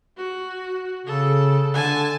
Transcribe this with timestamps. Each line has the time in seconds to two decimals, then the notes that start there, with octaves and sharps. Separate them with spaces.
0.17 F#4
1.07 C#3 A4
1.74 D3 G#5 A5